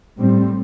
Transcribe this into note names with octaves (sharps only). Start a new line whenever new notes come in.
A2 G3 C4